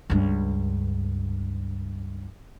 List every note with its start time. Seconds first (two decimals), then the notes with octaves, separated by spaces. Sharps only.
0.10 C#2 G2